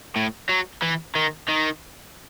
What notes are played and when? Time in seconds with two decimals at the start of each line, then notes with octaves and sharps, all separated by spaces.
0.16 A2
0.49 F#3
0.82 E3
1.15 D#3
1.49 D#3